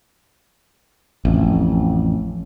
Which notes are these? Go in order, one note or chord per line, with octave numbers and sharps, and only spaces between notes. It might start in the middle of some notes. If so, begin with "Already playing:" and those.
A1 F2